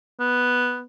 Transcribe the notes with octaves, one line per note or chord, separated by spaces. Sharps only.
B3